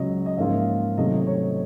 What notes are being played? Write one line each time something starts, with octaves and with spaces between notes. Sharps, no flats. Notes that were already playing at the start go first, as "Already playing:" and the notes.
Already playing: C#2 C#3 F#3 D#5
D#5
G#2 F3 A#3 C#4 F4 E5
C3 D#3 F#3 A3 D#5
D#5
C#5